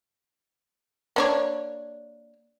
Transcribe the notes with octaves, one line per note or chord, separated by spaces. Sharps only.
A#3 D4 C#5